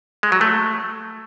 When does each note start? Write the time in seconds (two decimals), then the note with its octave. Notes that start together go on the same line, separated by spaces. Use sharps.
0.23 G#3
0.32 F#3
0.41 A3